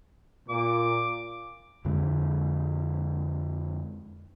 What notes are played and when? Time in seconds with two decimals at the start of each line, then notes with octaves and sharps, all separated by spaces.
0.49 A#2 D6
1.85 F2 D3 G#3